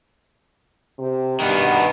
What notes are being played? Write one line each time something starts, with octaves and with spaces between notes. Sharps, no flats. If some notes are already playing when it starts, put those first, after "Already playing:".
C3
G2 B2 D#3 B3